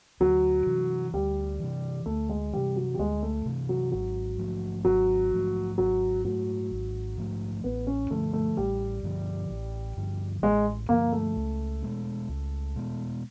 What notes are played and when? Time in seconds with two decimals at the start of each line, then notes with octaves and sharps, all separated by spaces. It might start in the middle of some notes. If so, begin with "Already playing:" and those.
0.20 D2 F#3
0.66 C3 E3
1.14 D2 G3
1.60 C3 E3
2.06 D2 A3
2.29 G#3
2.53 C3 E3 G3
2.76 F#3
2.94 G3
2.99 D2 G#3
3.23 A3
3.46 C3 E3
3.69 F#3
3.92 G#1 F#3
4.38 G#2 F3 A3
4.85 G#1 F#3
5.32 G#2 F3 A3
5.78 G#1 F#3
6.24 G#2 F3 F#3 A3
6.71 G#1
7.17 G#2 F3 A3
7.64 A1 B3
7.87 C#4
8.11 G2 D3 F3 A3
8.33 A3
8.57 A1 G3
9.03 G2 D3 F3
9.50 A1
9.97 G2 D3 F3
10.42 A1 G#3
10.89 G2 D3 F3 A#3
11.13 A3
11.36 C#2
11.82 B2 G#3 B3
12.29 C#2
12.75 B2 G#3 B3